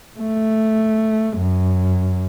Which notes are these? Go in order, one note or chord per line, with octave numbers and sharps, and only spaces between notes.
A3
F#2